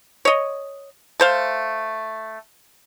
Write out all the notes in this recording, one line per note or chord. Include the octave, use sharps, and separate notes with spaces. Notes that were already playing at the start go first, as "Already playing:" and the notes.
C#5 D#5
A3 C5 F5